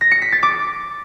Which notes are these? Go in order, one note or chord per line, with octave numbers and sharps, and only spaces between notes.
A#6
C#7
B6
A6
D6